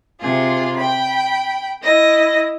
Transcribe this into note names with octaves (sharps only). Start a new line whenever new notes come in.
C3 F4 G#4
G5 B5
E4 D#5 A#6